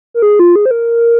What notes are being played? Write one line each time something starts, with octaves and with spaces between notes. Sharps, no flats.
A#4
G#4
F4
G#4
C5
A#4